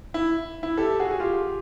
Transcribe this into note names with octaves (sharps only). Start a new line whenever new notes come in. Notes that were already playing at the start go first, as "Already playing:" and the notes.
E4
E4
G4 A4
F#4 G#4
G#4
F4 G4